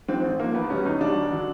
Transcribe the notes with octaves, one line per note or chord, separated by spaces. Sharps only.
G#2 F3 C4
A1
G#2 F3 A#3
E2 B3
B2 G3 C#4
E2 D#4
B2 G3 D4
E1
D3 F#3